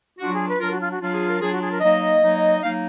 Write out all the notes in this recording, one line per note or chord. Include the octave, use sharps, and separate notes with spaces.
F#3 D4 F4 F#4
G#4
B4
F#3 D4 F4 A#4
F#4
F4
F#4
F#3 D4 F4
G#4
A#4
F#3 D4 F4 G#4
F#4
G#4
A#4
F#3 A#3 D#4 D#5
F#3 A#3 D#4
F#3 A#3 D#4 F5